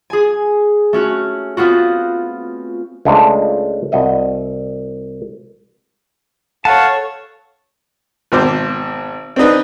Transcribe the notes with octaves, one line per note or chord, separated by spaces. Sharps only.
G#4 G#5
A3 C#4 F#4
B3 C4 F4 F#4
C#2 G#3 A3 D4 C5 A5
C2 F#4 D#5 E5
A4 C#5 F5 F#5 A5
G#1 B2 C5 D6
C4 D4 D#4 B4